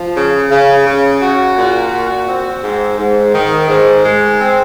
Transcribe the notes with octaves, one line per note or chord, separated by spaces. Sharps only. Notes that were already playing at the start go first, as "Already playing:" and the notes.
Already playing: F3
C#3
C#3
C#3
F#4
A#2
F#4
C4
G#2
G#2
D#3
G#2
G#3
C4